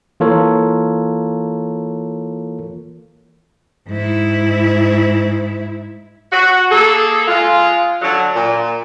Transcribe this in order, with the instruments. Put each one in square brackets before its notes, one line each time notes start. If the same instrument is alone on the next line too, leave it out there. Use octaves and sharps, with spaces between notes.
[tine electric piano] E3 A#3 F4 A4 A#4 C#5
[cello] G#2 E4
[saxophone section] F#4
A#3 G#4 A4
G#3 F4
D3 F#3
A#2